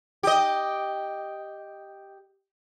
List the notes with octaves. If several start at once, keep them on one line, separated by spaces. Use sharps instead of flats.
G4 D#5